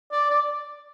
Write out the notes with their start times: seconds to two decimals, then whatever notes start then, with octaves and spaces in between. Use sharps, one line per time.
0.11 D5
0.30 D5